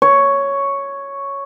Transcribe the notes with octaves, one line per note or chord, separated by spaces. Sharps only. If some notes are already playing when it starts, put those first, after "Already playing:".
C#5